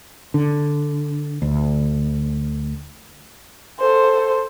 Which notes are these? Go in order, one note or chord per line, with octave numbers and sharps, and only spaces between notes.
D3
D2
A4 C5